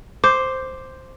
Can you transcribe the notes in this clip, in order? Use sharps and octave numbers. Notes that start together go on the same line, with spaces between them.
C5 D6